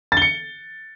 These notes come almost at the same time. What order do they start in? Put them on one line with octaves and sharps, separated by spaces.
A6 G7 C#7